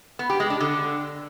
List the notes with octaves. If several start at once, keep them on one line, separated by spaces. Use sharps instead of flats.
B3
G4
G#3
D4
D3